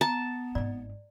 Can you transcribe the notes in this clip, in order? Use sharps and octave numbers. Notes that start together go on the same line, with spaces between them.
B3 A5 A#5
G#1 G#2 D5